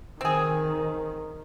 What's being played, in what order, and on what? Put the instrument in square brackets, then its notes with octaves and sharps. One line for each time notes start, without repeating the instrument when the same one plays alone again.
[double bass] D#3 [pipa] C4 G#4